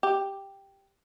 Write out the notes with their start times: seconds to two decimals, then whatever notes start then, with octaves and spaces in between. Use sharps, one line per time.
0.03 G4